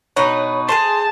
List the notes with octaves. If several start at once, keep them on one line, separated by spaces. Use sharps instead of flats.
B2 D#4 B4 C#5
G#4 A#4 C5 A5 C6